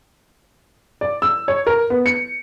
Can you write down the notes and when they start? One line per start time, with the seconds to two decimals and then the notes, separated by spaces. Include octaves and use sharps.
1.01 D5
1.22 E6
1.48 C#5
1.67 A#4
1.90 B3
2.06 C#7